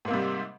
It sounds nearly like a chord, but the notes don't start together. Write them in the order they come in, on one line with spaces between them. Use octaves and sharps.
G#2 A#3 C3 G3